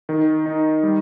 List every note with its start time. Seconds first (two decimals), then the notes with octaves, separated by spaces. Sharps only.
0.09 D#3
0.46 D#4
0.83 G3